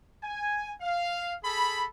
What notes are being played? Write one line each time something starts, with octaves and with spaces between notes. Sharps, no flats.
G#5
F5
G#4 A4 B5